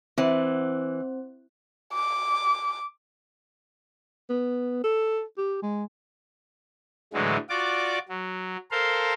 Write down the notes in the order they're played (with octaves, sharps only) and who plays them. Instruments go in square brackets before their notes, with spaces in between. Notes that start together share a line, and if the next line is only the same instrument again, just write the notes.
[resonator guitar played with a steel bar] E3 [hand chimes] C4 C5
[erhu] D6
[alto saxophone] B3
A4
G4
G#3
[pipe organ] A2 D3 E3 F#3 G#3
F4 F#4 D5 D6
F#3
A4 A#4 C5 F5 C6